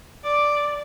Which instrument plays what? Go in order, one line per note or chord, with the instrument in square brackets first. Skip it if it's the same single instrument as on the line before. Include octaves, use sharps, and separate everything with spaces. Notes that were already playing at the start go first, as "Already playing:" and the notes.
[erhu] D5 [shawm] D6